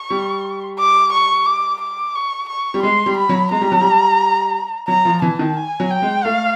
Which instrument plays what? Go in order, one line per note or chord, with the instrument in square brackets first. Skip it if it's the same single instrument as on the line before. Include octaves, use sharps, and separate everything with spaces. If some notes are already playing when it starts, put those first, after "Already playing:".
Already playing: [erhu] C#6
[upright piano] G3
[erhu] D6
C#6
D6
D6
C#6
C#6
[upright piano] G3
[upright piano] G#3 [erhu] C6
[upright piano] G3
[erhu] B5
[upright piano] F#3
[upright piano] G#3 [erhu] A#5
[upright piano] G3
F#3
G3
[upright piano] F#3 [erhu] A#5
[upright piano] F3
[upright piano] E3 [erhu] A5
[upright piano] D#3
[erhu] G#5
[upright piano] F#3
[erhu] G5
[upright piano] G#3
[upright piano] A3 [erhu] F5